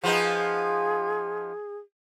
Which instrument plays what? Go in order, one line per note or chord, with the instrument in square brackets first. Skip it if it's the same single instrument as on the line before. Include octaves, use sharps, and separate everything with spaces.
[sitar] F3 B3 D#4 [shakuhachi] G#4